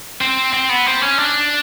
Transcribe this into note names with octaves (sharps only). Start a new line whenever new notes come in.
C4
C4
B3
C4
C#4
D4